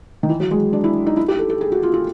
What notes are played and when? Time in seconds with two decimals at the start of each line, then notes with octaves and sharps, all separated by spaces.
0.23 D#3
0.29 E3
0.40 F#3
0.51 G#3
0.73 D4
0.84 E4
1.07 D#4
1.17 E4
1.28 G4
1.39 A4
1.50 A4
1.61 G#4
1.72 F#4
1.83 F4
1.94 F4